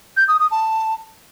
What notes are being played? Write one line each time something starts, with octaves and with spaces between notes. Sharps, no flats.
G6
D#6
D#6
A5